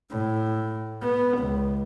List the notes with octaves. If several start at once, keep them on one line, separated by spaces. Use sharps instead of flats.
A2
B3
C#2